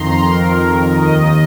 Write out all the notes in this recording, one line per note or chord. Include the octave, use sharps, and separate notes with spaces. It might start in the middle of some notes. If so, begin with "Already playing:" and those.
Already playing: F2 D#3 A#5 C6
F2 D#3 A#4
D#2 D#3 D#5